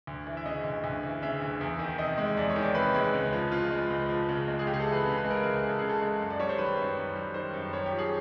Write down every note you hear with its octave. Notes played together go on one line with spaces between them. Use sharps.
D2
E3
E5
C#3 D#5
D2
D2
E3
C#3 E5
D2
E2
D#3
C3 D#5
G#3
E2 D5
C#5
D#3
D5
C3 B4
G#3
C#2
F3
C#3 F4
G#3
C#2
F3
C#3
G#3
G#4
C#2 G4
G#4
A4
E3
B4
C#3
B4
G#3
A#4
C#2 G#4
E3
A4
C#3 G#4
A4
G#3
F#2
D5
G3 C#5
C5
D#3 B4
F#2
F#2
G3
D#3 C5
F#2
F#2 C#5
G4
F3
G#4